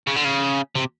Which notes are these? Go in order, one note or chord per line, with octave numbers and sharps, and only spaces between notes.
C#3
D3
C#3
C3